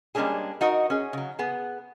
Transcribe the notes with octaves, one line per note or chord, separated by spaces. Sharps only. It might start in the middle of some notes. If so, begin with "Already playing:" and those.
G3 G#3 A#3 C#4 D4 G#4
D#4 F#4 A#4 D#5
C#4 G#4
C#3 F#3
B3 G#4